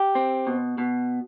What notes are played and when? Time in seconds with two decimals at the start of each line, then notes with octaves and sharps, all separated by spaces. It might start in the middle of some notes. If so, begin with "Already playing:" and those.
Already playing: G4
0.15 C4
0.47 B2
0.78 B2